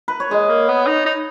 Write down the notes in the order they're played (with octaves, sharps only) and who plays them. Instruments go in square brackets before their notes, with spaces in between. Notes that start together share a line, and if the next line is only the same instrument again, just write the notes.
[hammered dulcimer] B4
C#5
[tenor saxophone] G#3 [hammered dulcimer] D#5
[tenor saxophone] A#3
B3
D#4
D#4